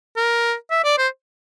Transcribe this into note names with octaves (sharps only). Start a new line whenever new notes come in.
A#4
E5
D5
C5